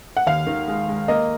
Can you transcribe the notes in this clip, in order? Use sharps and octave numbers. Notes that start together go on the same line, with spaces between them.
F#5
D#2 F5
D#3
G#3
G#3
A#3 D#5